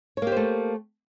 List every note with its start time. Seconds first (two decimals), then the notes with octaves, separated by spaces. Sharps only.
0.17 C#5
0.22 A#3
0.27 G4
0.32 C5
0.37 A3